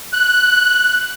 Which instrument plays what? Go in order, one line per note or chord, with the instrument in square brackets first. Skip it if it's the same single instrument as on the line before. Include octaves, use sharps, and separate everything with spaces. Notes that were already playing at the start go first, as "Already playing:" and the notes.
[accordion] F#6